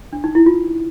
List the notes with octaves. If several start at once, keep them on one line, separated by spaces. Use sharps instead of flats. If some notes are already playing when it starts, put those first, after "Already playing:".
D4
D#4
E4
F4